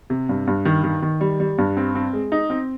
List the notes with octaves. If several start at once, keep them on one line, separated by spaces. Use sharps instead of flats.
C3
G2
G2
D#3
D#3
D#3
G3
G3
G2
C4
C4
G#3
D#4
C4